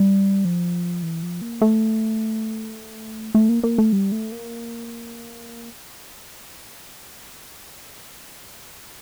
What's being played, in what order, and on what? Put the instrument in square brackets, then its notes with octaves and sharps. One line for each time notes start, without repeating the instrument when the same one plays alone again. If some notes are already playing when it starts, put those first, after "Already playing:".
Already playing: [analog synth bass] G3
F3
E3
F3
A#3
A3
A3
A#3
A#3
A3
G3
A3
A#3